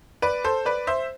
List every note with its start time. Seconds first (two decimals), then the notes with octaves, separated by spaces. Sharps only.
0.22 B4 D5
0.44 A4 C5
0.66 B4 D5
0.87 C5 E5